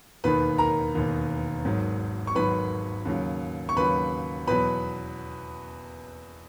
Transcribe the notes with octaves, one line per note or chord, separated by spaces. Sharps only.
E1 D#2 D#3 B4 B5
A#4 A#5
E1 D#2 D#3
G#1 G#2 D#3 F#3
C#6
G#1 G#2 D#3 F#3 B4 B5
D#2 C#3 F#3
C#6
D#2 C#3 F#3 B4 B5
E2 B2 F#3 B4 B5